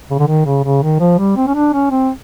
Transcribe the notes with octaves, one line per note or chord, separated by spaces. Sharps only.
C#3
D3
D#3
C#3
C#3
D#3
F3
G3
C4
C#4
D4
C#4
C4